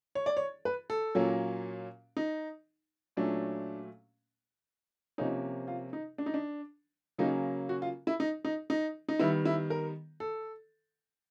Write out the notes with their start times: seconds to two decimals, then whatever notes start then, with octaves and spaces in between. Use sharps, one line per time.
0.15 C#5
0.26 D5
0.37 C#5
0.65 B4
0.90 A4
1.15 A#2 F#3 A#3 C#4
2.17 D#4
3.17 A#2 F#3 A3 C#4 D4
5.18 C3 F3 A#3 C#4 D#4
5.67 F4
5.93 D#4
6.18 D4
6.26 D#4
6.34 D4
7.18 C#3 F#3 A#3 C#4 D#4
7.69 F#4
7.82 F4
8.07 E4
8.20 D#4
8.45 D#4
8.70 D#4
9.09 D#4
9.19 D#3 G3 B3 E4
9.45 E4
9.70 A#4
10.20 A4